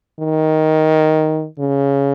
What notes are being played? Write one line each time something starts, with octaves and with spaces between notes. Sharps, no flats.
D#3
C#3